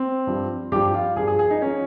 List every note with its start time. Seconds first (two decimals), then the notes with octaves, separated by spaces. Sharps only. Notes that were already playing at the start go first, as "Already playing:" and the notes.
Already playing: C4
0.27 G2 F3
0.72 G2 F3 G4
0.94 F4
1.16 G2 F3 G#4
1.28 G#4
1.39 G#4
1.51 D#4
1.62 F3 C#4